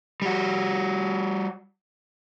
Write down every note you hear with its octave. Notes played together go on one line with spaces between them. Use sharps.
G3 F#4